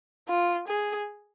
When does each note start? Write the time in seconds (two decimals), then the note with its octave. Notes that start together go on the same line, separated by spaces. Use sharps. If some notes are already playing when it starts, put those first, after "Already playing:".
0.28 F4
0.68 G#4